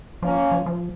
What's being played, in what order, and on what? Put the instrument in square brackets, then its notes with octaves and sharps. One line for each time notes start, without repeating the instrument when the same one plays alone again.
[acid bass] F3 [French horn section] A#3 C#4
[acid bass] F3
F3